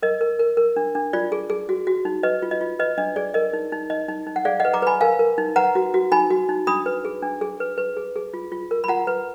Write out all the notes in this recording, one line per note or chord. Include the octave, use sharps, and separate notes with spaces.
A#4 D#5
A#4
A#4
A#4
D4
D4
F4 D5
G#4
G#4
F#4
F#4
D#4
B4 D#5
F4
D#5
F4
B4 D#5
D4 D#5
G#4 D5
A#4 D#5
D#4
D#4
D#4 D#5
D#4
D#4
F#5
G#4 D5 F5
B4 D#5 F#5
A#5 D6
B4 G#5 B5
A#4 F5 G#5
A#4
D#4
B4 F#5 A#5
F#4
F#4
D#4 G#5 B5
F#4
D#4
D4 B5 D#6
B4
G#4
D4
G#4
B4
B4
G#4
G#4
F4
F4
A#4
B5
F4 F#5 A#5
B4